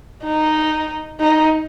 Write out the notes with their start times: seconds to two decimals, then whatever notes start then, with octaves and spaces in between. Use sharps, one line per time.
0.23 D#4
1.21 D#4